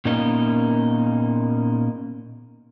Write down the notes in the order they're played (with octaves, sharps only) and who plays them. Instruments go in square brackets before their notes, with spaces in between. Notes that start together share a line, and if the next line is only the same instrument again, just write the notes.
[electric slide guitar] A#2 A#3 B3 C#4 D#4